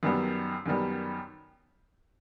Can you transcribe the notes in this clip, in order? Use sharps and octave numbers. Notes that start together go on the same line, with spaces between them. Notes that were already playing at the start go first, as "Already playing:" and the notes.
F#2 D#3 G3 B3
F#2 D#3 G3 B3